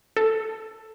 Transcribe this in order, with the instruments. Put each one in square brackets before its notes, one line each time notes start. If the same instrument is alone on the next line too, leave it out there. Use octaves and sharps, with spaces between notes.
[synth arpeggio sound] A4